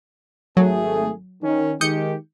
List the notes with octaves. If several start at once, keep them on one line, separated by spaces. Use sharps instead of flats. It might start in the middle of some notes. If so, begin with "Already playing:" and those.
G#1 F#3 A3 G#4
D#3 C#4
D#3 G#3 G4 D#6 G6 C#7